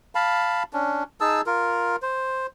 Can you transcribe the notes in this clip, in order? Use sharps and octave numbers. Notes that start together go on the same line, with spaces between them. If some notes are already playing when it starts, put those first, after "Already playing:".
F5 A5 B5
C#4 D4
D#4 G#4 A5 E6
F4 A#4
C5